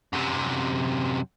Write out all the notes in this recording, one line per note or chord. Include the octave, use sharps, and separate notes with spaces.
F#2 C3